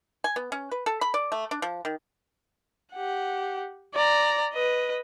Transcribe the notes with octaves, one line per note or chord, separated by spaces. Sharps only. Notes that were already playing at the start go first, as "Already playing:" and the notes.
G#5
B3
C#4
B4
A4
B5
D5
A3
D4
F3
D#3
G4 F#5
D5 A#5
B4 D#5